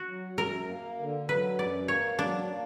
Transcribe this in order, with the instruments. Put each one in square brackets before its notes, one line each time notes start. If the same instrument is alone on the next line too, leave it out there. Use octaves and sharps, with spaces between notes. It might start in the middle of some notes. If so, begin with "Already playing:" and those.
Already playing: [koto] F#4
[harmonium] F#3
[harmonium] F#2 [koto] A#4
[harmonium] A#3
D3
[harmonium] F#3 [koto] B4
[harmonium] F#2 [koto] D5
[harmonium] A#3 [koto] C#5
[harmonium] F#3 [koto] D4
[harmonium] A#3